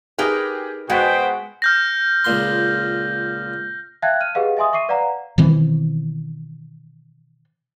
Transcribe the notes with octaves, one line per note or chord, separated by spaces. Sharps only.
D#4 G4 G#4 A#4 B4
B2 G#3 F#4 G#4 C5 F#5 G5 B6
F6 G6 A#6
C#2 A#2 C6
E5 F5 G5 A5 F#6 G#6
F6 D#7
G4 G#4 B4 D#5 F5 F#5
D#5 E5 G#5 C6 D#6
E5 C#6 D6 C7 D#7
B4 D5 F5 F#5 A#5
B2 D#3 E3 C4